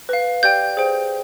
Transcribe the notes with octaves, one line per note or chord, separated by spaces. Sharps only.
B4 F5
G4 D5 G5 G6
G#4 C5 G5